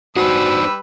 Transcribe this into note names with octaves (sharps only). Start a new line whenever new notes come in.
G3 D4 D#4 F#4 B4 C5 E6